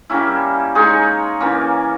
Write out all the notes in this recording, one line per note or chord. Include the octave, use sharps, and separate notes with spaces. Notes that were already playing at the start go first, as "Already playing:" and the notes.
G3 A#3 C#4 E4
G#3 D#4 G#4 C#5
E3 A#3 C#4